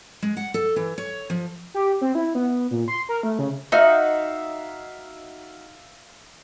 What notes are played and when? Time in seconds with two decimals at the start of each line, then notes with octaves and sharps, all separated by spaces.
0.22 G#3
0.37 F#5
0.54 A4
0.76 E3
0.98 C#5
1.30 F3
1.74 G4
2.01 C4
2.15 E4
2.35 B3
2.71 A#2
2.88 C6
3.09 A#4
3.23 A3
3.39 C#3
3.72 D#4 F#4 E5 F5